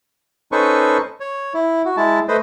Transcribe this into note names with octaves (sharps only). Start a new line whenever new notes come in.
C#4 D#4 A4 B4 C5 C#6
C#5
E4
F#4
G#3 E4 A5
A3 B4 C5 D#5